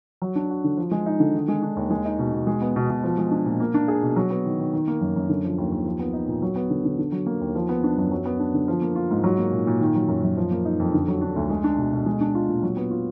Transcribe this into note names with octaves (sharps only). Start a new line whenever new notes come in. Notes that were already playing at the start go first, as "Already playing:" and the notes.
F#3
D4
F#4
D3
F3
G#3
D#4
D3
D#3
G#3
D4
D#2
G#3
D#4
B2
B2
G#3
B3
B2
B2
F3
G#3
D4
A#2
A#3
D4
G#4
B2
F#3
B3
D#3
D#3
D#3
A#3
F#2
F#2
D3
F3
D#2
D#2
F3
B3
D#4
A#2
F#3
B3
D3
D3
D3
F#3
A#3
D#2
F3
B3
D4
F#2
F#3
B3
D4
D3
F3
A#3
F4
G#2
F#3
A#3
A#2
A#2
D#3
F#3
F#2
F#2
F3
A#3
D#4
F2
D3
F#3
D4
D2
G#3
D4
B2
B2
G#3
D4
F4
A#2
F#3
B3
F4